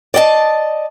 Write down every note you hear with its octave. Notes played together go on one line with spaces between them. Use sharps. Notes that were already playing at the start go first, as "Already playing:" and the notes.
D5 D#5 F#5 A5